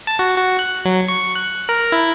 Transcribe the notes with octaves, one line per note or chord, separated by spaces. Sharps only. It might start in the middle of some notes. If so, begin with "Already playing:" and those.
A5
F#4
F#4
F#6
F#3
C#6
F#6
A#4
E4